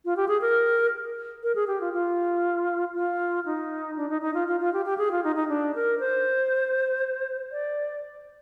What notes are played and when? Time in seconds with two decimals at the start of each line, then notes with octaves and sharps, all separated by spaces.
0.05 F4
0.17 G4
0.28 G#4
0.41 A#4
1.43 A#4
1.55 G#4
1.67 G4
1.81 F4
1.93 F4
2.95 F4
3.46 D#4
3.97 D4
4.10 D#4
4.22 D#4
4.34 F4
4.48 F4
4.60 F4
4.73 G4
4.86 G4
4.98 G#4
5.11 F4
5.24 D#4
5.36 D#4
5.49 D4
5.75 A#4
6.00 C5
7.52 D5